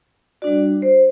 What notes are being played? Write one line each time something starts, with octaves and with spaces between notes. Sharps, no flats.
G3 D4 F#4 D5
C5